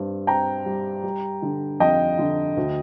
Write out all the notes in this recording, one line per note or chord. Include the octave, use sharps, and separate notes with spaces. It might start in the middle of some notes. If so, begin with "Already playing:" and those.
Already playing: G2 C4
C4 G5 A#5
G3
G3
D3
F2 D#5 G5
D3
D2